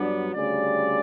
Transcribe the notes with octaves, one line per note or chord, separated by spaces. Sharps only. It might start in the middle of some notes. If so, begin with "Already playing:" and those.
Already playing: G2 F#3 B3 D4 D5
D2 C#3 G3 D5